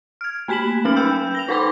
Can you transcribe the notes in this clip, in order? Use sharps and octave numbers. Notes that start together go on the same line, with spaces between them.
F6 G#6
A3 A#3 B5 B6 E7 F#7
F#3 C#4 B4 F6 F#7
G5 B5 E6 G6
A#6 F7
D#4 A4 B4 B5 C6 D6